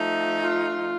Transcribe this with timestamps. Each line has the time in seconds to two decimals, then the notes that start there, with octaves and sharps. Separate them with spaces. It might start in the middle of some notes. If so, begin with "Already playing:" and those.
Already playing: F3 A3 D#4
0.43 F4